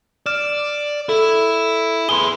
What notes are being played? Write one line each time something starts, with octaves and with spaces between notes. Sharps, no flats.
D5 F6 E7
E4 A4
G#4 B4 C6 G7